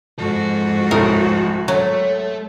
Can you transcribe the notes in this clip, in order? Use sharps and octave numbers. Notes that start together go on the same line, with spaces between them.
G#2 F3 F#4 A4
C2 A2 A#4 D#6
F#3 A3